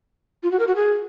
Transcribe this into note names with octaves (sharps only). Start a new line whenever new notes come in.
F4
F#4
A#4
F#4
G#4